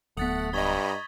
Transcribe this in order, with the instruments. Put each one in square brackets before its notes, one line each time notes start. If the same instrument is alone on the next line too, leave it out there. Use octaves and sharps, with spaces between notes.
[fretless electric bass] D1 B3 [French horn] A3 [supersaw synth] F#5 [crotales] D#6 A6 B6
[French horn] G2 [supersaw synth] D#5 A#5 B5 [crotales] C#6 G#6 G7